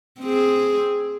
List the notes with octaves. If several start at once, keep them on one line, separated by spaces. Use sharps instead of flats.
C4 G#4